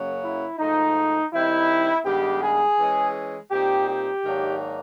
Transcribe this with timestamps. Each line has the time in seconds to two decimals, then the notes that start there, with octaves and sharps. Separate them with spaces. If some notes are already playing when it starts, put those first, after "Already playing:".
Already playing: F#2 C#3 F#3 A#3
0.22 E4
0.58 G#2 F3 A3 D#4
1.32 D#3 G3 C4 D#4 E4
2.05 G2 D#3 G#3 B3 G4
2.42 G#4
2.78 E3 G#3 C#4
3.51 A#2 G3 C4 D#4 G4
3.88 G4
4.24 G#2 D#3 F#3 A#3 D4